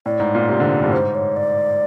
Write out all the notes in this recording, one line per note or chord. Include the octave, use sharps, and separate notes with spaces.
A2 D5
G#2
A#2
C3
D3
G#2
G2
A2
G#2 C5
C#5
D5